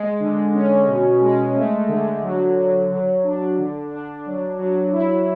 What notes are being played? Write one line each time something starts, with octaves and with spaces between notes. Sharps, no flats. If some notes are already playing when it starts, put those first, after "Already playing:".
Already playing: G#3
D3
C#4
B2
G#3
A3
D3
F#3
F#3
F#3
D4
D3
D4
F#3
F#3
E4